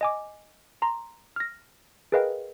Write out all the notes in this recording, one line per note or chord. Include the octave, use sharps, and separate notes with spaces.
D#5 G#5 D6
A#5 C6
F6 A#6
G#4 A#4 B4 D#5 F5 G5